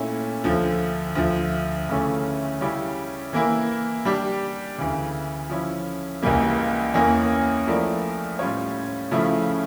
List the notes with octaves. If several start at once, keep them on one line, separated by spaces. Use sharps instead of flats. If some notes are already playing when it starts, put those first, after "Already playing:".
Already playing: A#2 A3 C#4 E4 A4
D2 D3 F3
D2 D3 F3
D2 C#3 E3 A3 C#4
C#3 G3 C#4 E4 G4
E3 A#3 E4
G3 D4 G4
D2 C#3 E3
F3 C#4 E4
C#2 C#3 E3 G3 A#3
E2 E3 A#3 C#4
F3 A3 E4 A#4 D5
A2 G3 C#4 F4 C#5
C#3 F3 A3 C#4 E4